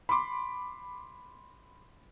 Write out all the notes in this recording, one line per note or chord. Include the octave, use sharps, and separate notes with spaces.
B5 C6 D6